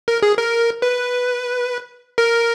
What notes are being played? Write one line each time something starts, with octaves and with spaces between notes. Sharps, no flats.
A#4
G#4
A#4
B4
A#4